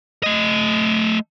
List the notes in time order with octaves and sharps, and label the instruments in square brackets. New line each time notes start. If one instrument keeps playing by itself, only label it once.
[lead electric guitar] A3 D#5